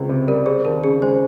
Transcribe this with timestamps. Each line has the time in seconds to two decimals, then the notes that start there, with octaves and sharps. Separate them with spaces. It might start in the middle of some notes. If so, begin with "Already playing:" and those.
Already playing: C#2 C4
0.09 C3
0.27 G3 A#4
0.46 C4 G#4
0.65 D#2 A#4
0.83 C#3 G#4
1.02 G#3 C5